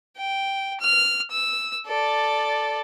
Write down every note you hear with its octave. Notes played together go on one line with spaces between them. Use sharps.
G5
F6
E6
A4 D5